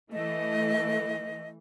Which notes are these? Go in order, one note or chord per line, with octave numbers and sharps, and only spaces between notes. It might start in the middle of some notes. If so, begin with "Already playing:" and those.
E3 A3 D#5